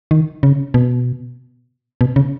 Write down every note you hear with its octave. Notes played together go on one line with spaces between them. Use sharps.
D#3
C#3
B2
B2
C#3